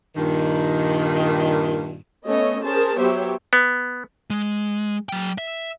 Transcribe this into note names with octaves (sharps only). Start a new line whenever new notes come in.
G2 A#2 D#3
A3 B3 C#4 C#5 D#5
C#4 G#4 A#4 C5 A5
F#3 B3 G4 C5 C#5 E5
B3
G#3
F#3 G5
E5